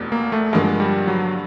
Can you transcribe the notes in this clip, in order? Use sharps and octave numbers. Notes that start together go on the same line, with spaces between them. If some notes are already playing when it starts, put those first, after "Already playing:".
Already playing: F1 E2 B2
A#3
A3
G2 D3 F3 G#3 A#3
G3
F#3